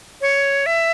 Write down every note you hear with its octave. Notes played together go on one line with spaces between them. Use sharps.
C#5
E5